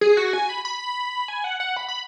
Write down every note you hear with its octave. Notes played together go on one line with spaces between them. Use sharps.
G#4
F#4
G#5
B5
B5
G#5
F#5
F#5
B5
B5